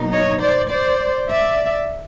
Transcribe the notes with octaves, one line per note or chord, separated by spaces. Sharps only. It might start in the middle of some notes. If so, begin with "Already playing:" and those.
Already playing: B2 F#3 A#3 D#4
C#5 D#5
C5 D5
C5 D5
D5 E5